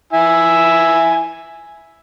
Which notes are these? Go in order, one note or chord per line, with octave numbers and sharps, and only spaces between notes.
E4 G#5 E6